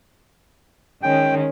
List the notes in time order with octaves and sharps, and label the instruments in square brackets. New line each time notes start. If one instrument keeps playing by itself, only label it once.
[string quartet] D#3 G#3 C#4 [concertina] G5